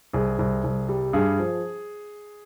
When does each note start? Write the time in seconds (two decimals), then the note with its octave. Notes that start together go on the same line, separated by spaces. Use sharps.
0.13 C2 G#4
0.39 C2
0.64 C2
0.89 G3
1.13 G2 G#4
1.39 F3